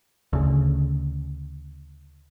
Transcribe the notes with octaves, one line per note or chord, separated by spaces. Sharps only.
D2 C#3